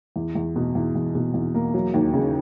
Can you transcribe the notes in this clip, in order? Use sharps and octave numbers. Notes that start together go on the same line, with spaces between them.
E2
E2
B2
E2
E2
B2
E2
A#3
F#3
D#2
C#3